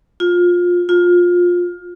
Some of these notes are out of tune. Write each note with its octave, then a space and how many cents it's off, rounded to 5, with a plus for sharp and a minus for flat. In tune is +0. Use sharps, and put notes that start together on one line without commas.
F4 +20
F4 +20